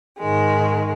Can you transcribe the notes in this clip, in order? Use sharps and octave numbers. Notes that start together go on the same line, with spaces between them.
G#2 D#3 G#3